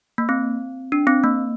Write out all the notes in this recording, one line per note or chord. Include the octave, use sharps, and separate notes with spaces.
A#3
C4
D4
C4
A#3